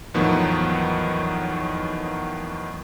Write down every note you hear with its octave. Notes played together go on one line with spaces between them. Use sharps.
E2 A2 D#3 F3 F#3 B3